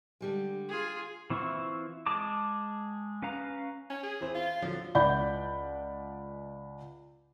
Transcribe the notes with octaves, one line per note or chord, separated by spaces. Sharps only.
D3 G3 G#3
F4 G#4
E3 C4 E4 F4 C#6
G#3 G#4 A5 D6
C#4 B4 F5 A#5
C#4
G#4
E3 C4 C5
F4
D3 F3 F#3
C#2 D5 F#5 B5 G6